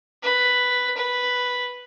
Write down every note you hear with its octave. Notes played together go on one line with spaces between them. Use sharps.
B4
B4